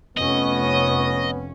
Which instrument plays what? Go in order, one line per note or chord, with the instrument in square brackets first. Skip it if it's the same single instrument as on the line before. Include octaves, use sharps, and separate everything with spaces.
[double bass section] F1 C#4 [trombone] B3 [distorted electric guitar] D#5